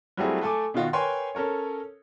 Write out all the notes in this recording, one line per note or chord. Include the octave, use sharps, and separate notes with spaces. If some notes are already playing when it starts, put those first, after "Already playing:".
F#3 G3 A3 C4 E4 G#4
A3 A4 G#5 D6
B2 D#3 F4 F#4
A#4 B4 C#5 G5 G#5 C6
C#4 A4 A#4 C#5